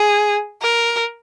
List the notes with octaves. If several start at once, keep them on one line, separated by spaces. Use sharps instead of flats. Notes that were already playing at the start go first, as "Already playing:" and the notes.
Already playing: G#4
A#4